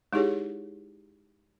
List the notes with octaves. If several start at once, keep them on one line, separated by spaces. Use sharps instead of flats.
G#3 D#4 E4 G4 G#4 C#5